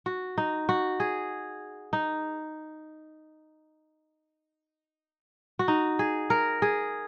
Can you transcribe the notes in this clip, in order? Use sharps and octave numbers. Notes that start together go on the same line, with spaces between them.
F#4
D#4
F#4
G#4
D#4
F#4
D#4
G#4
A#4
G#4